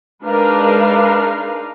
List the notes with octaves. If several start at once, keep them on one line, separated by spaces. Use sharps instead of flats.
G#3 D4 D#4 A#4 B4 F5